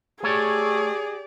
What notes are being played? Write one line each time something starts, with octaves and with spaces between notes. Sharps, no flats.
A3 G4 G#4 C#5 D5